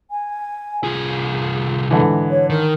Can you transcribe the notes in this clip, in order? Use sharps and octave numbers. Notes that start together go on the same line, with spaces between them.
G#5
C2 F4 G#4
G#2 D3 E3
C#5
D#3 A#4